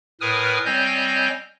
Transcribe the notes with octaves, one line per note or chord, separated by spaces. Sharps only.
A2 A#4 B4 G#5 D#6 F6
G3 C4 C#5 D#5 G#5 G6